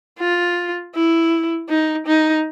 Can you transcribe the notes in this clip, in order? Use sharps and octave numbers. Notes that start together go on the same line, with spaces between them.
F4
E4
D#4
D#4